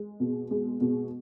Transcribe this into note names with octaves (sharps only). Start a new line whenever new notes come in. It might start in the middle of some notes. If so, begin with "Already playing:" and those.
Already playing: G#3
B2
G#3
B2